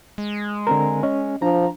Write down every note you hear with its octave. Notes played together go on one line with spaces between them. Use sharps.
G#3
D3 C4 A#4 A#5
C#4 D#5
F3 D4 A#5